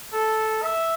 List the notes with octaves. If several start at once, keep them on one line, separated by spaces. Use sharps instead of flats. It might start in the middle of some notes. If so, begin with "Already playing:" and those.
A4
E5